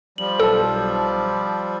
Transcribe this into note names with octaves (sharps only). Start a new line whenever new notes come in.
F3 G3 F#7
B1 A4 A5 E6